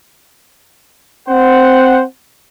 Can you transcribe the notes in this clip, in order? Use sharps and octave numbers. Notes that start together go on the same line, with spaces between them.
C4 C5 F#5